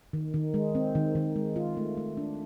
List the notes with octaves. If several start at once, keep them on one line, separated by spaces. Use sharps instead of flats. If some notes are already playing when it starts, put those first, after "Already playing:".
D#3
D#3
G#3
C4
D#3
D#3
G#3
F4
A3
A3
D4